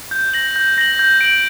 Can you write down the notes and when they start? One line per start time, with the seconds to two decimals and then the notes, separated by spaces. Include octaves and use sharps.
0.11 G6
0.33 A#6 F#7
0.56 G6
0.78 A#6 F#7
0.99 G6
1.21 D7 F#7